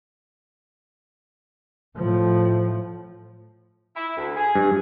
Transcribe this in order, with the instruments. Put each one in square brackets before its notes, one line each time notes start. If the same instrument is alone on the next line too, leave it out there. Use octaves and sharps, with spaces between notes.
[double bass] A2 F3
[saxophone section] E4
D2
G#4
[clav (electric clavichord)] G2